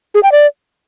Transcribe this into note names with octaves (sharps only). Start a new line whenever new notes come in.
G#4
G5
D5